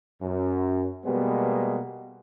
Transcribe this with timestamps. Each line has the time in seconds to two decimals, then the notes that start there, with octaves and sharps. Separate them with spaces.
0.22 F#2
1.05 B2 G3 G#3 A#3 B3